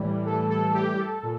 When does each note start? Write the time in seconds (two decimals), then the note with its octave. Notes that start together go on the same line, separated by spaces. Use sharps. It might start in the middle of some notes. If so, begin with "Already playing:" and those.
Already playing: A2 E3 G3
0.26 A4
0.50 A4
0.74 G4
0.98 A4
1.23 A#2